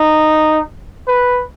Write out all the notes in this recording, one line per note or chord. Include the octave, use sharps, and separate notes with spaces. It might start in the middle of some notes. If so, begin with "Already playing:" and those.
Already playing: D#4
B4